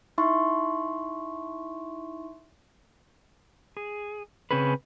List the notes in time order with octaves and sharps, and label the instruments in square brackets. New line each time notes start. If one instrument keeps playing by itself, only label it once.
[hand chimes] D#4 E4 E5 C6 C#6
[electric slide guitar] G#4
C#3 C4 C#4 G#4 B4